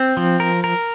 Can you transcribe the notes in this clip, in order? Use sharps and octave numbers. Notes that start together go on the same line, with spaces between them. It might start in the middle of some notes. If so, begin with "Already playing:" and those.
Already playing: C4
F3
A#4
A#4